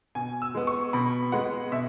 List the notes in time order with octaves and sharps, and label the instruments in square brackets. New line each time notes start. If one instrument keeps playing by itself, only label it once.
[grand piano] B2 G#5
E6
G#3 B3
C#6
B2 B5
G#3 B3 F#5
B2 E5